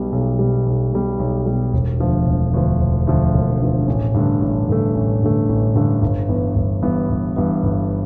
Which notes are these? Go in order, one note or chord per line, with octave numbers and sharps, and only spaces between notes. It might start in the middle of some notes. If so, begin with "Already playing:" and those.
Already playing: B1 B2 G3
B1
B2 G3
B1
B2 G3
B1
B2 G3
E1
D2 D3 F3
E1
D2 D3 F3
E1
D2 D3 F3
E1
D2 D3 F3
A1
G2 D3 A3
A1
G2 D3 A3
A1
G2 D3 A3
A1
G2 D3 A3
G1
G2 E3 B3
G1
G2 E3 B3
G1
G2 E3 B3
G1